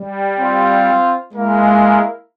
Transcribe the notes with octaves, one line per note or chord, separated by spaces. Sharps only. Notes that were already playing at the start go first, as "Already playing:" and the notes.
Already playing: G3
C4 F4 C5 F5
G#3 A#3 E4 A#4 F5